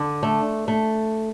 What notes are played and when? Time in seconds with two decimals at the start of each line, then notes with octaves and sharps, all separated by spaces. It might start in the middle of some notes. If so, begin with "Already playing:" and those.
Already playing: D3
0.23 A3
0.68 A3